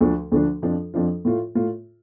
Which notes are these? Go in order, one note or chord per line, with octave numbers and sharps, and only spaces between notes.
D2 D3 F3 D4
D2 D3 F3 D4
F2 F3 D4 F4
F2 F3 D4 F4
A2 A3 F4
A2 A3 F4